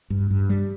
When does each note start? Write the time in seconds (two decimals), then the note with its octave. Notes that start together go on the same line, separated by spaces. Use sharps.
0.10 G2
0.31 G2
0.50 G3